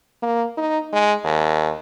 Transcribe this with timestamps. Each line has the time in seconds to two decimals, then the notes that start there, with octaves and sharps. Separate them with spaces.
0.23 A#3
0.57 D#4
0.93 G#3
1.24 D#2